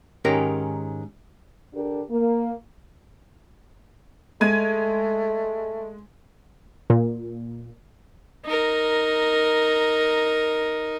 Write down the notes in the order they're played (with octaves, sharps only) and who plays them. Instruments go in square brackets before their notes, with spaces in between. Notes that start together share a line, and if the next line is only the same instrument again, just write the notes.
[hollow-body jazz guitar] G#2 D#3 C#4 G4 A#4 A#5
[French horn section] D3 D4 G4 A#4
A#3
[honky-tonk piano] G#3 G#6 D#7 [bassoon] A3
[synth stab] A#2
[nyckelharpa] D#4 A#4